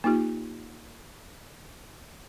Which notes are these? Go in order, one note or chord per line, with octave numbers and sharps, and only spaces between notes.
A#3 D#4 F4 G4